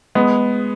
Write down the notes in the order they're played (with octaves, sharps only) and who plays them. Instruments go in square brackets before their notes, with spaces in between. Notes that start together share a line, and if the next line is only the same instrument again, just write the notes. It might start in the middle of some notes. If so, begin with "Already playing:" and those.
[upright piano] G#3 B3